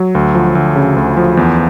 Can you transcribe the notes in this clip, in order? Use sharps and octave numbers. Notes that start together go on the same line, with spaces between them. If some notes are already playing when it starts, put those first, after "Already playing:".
Already playing: F#3
D2
F3
D2
C#3
D2
F3
E2